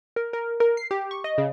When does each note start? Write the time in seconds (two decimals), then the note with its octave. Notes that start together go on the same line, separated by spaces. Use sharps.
0.16 A#4
0.33 A#4
0.60 A#4
0.77 C7
0.91 G4
1.11 C#6
1.24 D#5
1.38 C#3